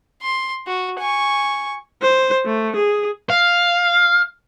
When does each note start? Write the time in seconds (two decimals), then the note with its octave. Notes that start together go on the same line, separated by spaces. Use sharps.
0.23 C6
0.67 F#4
1.00 G#5 C#6
2.02 C5
2.45 A3
2.77 G#4
3.30 F5